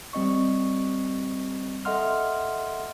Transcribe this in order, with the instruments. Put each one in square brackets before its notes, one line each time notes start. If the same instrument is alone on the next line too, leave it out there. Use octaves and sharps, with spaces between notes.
[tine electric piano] G3 C4 D#5 C#6
A4 D#5 E5 F#5 C6 F6